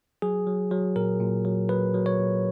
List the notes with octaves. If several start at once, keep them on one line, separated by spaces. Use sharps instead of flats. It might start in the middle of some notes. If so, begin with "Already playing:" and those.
F#3 G#4
F#3
F#3
A#2 A#4
A#2
F#3
F#3 B4
F#3
C#5
A#2